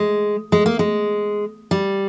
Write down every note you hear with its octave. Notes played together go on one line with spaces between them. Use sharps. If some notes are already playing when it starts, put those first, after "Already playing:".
Already playing: G#3
G#3
A#3
G#3
G3